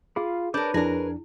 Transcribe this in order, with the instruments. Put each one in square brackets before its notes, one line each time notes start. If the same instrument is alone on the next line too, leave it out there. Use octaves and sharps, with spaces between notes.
[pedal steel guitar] F4 F5 B5 [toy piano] G#4
[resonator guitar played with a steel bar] D4 A#4 [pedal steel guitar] B4 C#5 B5 [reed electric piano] D6 G6
[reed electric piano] F2 D4 [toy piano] E4 [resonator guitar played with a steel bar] G#4 A#4